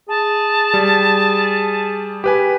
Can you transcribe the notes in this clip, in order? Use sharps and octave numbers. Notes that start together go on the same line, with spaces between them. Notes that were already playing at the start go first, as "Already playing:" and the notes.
G#4 A5
G3
G4 B4 G#5